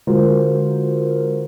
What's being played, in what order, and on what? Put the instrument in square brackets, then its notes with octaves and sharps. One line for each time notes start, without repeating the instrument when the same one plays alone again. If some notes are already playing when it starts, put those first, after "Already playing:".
[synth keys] D3 G#3 F4 F#4 A#4 C5